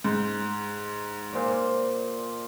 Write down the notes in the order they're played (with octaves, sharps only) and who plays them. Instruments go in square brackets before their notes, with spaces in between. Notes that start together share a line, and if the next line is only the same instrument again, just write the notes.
[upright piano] G#2
[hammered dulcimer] A#2 C5 D5